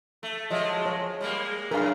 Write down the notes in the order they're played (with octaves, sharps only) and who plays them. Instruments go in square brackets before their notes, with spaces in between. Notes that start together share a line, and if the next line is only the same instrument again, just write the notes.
[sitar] A3
[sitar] F3 F#3 G#3 [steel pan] D#5 E5
[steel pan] C#5
[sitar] G3 G#3 A#3
[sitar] F#2 A2 [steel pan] A#4 F5